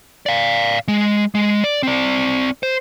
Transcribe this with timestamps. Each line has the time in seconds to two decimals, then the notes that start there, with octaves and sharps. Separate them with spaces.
0.26 D5 F5
0.88 G#3
1.35 G#3
1.64 D5
1.83 C4 D5
2.63 C5